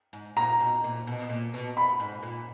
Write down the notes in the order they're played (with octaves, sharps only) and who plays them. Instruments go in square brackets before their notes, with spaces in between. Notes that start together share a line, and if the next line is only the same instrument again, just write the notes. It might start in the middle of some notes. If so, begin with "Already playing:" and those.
[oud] G#2
[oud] A#2 [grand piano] A#5
[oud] B2
A#2
B2
A#2
B2
[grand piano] B5
[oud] G#2
A#2